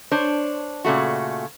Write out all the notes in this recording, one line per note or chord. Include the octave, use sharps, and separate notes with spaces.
D4 C5 C#5
A#2 C#3 A3 F#4